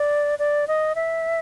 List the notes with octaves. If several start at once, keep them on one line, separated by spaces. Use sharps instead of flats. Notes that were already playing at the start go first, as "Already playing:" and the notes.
Already playing: D5
D5
D#5
E5